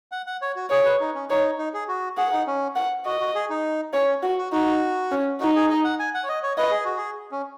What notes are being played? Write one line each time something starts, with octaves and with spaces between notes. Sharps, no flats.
F#5
F#5
C#5
F#4
G#4 C#5
B4
D#4
C#4
D#4 C#5
D#4
G#4
F#4
G#4 F#5
D#4
C#4
F#5
F#4 D#5
F#4
G#4
D#4
C#4 C#5
F#4
F#4
D#4 F#4
C#4
D#4 F#4
G#4
D#5
F#5
G#5
F#5
C#5
D#5
C#5
B4 D#5
G#4
F#4
G#4
C#4